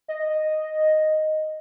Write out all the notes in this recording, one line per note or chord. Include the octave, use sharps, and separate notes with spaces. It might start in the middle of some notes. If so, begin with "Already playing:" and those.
D#5
D#5